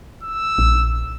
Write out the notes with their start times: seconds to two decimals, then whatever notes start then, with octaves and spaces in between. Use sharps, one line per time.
0.23 E6
0.58 A#1